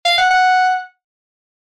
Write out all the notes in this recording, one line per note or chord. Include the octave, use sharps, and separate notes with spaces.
F5
F#5
F#5